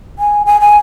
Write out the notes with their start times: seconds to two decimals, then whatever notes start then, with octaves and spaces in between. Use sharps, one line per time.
0.19 G#5
0.46 G#5
0.61 G#5